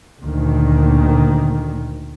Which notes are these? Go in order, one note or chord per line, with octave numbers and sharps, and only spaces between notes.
D2 A#2 D#3